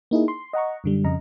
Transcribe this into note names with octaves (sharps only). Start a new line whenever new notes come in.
A#3 D#4 E4 G#4
C6
D#5 F#5 A#5 C#6
F#2 D3 G3
F2 C#3 D#5 A#5